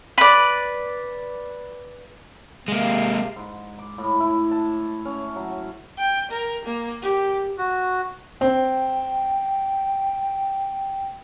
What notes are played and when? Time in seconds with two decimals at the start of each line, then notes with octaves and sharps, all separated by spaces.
0.18 B4 D5
2.68 C3 G#3 A#3 F5
3.36 G#2
3.78 D6
3.98 A2
4.20 E4
4.51 A5
5.05 C#4
5.36 F#3
5.98 G5
6.31 A#4
6.65 A#3
7.02 G4
7.58 F#4
8.41 C4 G5